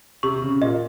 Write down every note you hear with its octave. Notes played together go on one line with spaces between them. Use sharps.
C3 C#6
C#3
A#2 D#5